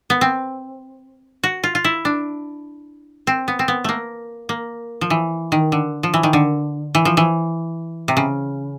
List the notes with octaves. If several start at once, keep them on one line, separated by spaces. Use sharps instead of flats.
B3
C4
F#4
F4
F4
E4
D4
C4
B3
C4
B3
A3 A#3
A#3
F3
E3
D#3
D3
F3
E3
D#3
D3
E3
F3
E3
C3
C#3